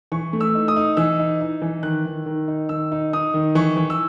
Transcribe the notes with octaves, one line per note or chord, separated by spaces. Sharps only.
E3 C#6
A3
E6
D#4
D#6
D#4
E3 E6
D#4
D#4
E3
D#3 F#6
D#3
D#3
D#4
D#3 E6
D#4
D#4 D#6
D#3
E3 C#6
E3
E6